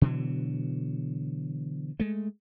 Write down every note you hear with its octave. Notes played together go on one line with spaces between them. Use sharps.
B2 D3 E3 F#3
G#3 A3